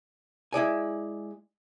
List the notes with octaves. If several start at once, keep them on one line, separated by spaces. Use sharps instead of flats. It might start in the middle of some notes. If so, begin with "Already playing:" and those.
G#3 E4 D5 G#5